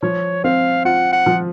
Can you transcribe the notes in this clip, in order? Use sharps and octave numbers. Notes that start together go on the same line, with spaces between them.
F3 C#5
C4 F5
F4 F#5
F#5
F3